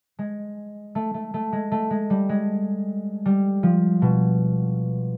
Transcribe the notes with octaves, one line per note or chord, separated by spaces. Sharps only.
G#3
A3
A3
A3
G#3
A3
G#3
G3
G#3
G3
F3
B2